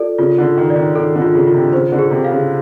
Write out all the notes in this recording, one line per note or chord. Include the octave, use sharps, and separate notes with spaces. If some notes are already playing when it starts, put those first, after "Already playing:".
Already playing: F4 A4 D5
C#3 F4
D3
F4
D#3
D5
D#3
D#3 A4
D3
F4
C#3
F4
C3
C#3 C5
D3
G#4
C3
F5
C#3